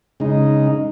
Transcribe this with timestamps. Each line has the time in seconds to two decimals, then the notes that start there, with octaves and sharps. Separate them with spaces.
0.20 C#3 G#3 D#4